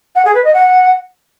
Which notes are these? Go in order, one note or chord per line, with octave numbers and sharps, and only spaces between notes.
F#5
G#4
B4
D#5
F#5